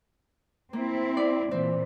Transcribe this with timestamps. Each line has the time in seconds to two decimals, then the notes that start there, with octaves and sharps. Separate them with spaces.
0.73 A#3 C4 E4
1.17 D5
1.51 A#2 E3 C4